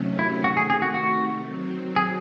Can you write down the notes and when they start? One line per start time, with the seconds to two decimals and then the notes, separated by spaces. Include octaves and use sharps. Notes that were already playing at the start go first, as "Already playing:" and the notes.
Already playing: C3 D#3 F#3 A3 C#4
0.19 E4
0.44 C3 D#3 A3 F#4
0.57 G#4
0.70 G#4
0.82 F#4
0.94 F#4
1.45 D#3 F#3 C4
1.96 G#4